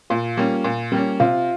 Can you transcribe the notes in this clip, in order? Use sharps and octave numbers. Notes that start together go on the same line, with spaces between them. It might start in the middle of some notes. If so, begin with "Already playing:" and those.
A#2 F4
G3 A#3 C#4
A#2
G3 A#3 C#4
C3 F4